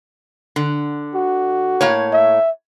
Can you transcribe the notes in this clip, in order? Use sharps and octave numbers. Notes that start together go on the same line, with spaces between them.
D3
F#4
A2 A#3 C#5
E5